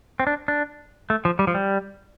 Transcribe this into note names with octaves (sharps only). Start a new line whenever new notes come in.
C4
D4
D4
A3
F3
G3
F3
G3